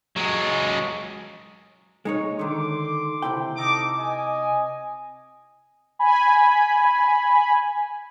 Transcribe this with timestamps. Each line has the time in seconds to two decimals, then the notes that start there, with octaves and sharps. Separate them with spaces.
0.16 F#3 G#3
2.05 G#3 D#4 C#5
2.39 D3 D#3 C6 D6
3.22 C3 E4 G5
3.56 D#4 A4 D6
3.97 D#5 G#5
5.99 G#5 B5